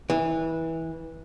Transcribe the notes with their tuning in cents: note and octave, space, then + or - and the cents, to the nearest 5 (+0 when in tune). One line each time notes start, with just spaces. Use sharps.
E3 -20